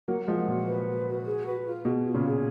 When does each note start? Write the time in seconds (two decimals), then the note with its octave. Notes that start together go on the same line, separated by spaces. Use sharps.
0.08 F#3 A#3 F#5
0.27 F3 G#3 F#5
0.47 A#2 F#4
0.67 B4
0.87 F#4
1.07 F#4
1.26 G#4
1.46 B4
1.65 F4
1.85 B2 G#4
2.04 F4
2.14 A#2 C#3
2.25 G#4